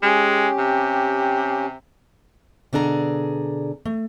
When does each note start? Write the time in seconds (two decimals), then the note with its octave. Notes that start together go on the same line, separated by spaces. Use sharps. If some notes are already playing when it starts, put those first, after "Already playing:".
0.03 G#3 C#4 G4
0.58 C3
2.73 B2 D3 D4 G#4 A#5
3.85 A3